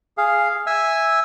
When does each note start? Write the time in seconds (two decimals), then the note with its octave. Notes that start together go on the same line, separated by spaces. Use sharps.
0.18 G#4 F5
0.67 E5 G#5 E6